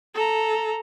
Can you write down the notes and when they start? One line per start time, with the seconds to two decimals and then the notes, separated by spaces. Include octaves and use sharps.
0.14 A4 A#5